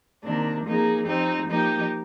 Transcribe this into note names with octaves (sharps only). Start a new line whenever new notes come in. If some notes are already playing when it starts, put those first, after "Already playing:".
C3 D#3 A#3 D4
F3 A#3 D#4 G#4
F3 C4 D#4 G4
F3 A#3 D#4 G4